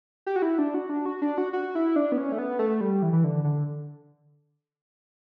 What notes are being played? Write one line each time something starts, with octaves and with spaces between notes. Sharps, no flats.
G4
F#4
E4
D4
F#4
D4
F#4
D4
F#4
F#4
E4
D4
B3
C#4
A3
B3
A3
G3
E3
E3
D3
D3